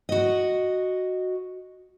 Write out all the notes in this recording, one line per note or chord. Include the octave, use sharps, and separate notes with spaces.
F#4 D#5